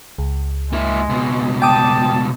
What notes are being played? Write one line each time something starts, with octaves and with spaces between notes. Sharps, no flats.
C#2
G#3 A#3 E4
C#2 B2
G5 A5 D6 D#6